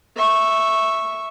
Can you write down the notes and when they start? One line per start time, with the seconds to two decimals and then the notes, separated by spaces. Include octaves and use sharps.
0.17 E5 C#6